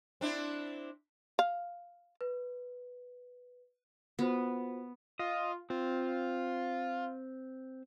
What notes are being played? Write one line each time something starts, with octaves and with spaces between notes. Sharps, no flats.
C4 D4 E4
F5
B4
B3 F4 F#4 C5
F4 D#5
C4 F4